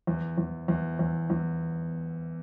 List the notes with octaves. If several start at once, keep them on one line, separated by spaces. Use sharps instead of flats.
E2
E2
E2
E2
E2